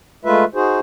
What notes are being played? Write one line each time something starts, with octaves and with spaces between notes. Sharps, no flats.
G#3 A3 F4 B4 E5
D#4 F#4 G#4 C5